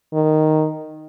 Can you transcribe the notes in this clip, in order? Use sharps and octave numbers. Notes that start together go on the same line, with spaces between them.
D#3